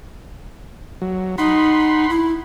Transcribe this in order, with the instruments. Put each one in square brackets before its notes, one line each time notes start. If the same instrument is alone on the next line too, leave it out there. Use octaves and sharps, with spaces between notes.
[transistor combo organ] F#3
[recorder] D#4 [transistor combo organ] F#5 B5 C6
[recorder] E4